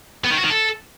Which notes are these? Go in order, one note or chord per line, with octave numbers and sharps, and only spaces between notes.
B3
D#3
F#4
D#3
A4